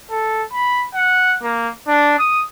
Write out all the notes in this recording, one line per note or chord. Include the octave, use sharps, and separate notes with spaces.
A4
B5
F#5
A#3
D4
D#6